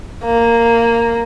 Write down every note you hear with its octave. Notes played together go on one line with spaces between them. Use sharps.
A#3